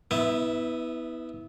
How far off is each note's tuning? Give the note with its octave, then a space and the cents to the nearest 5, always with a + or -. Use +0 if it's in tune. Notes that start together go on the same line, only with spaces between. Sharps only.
B3 +0 E4 -30 E5 +0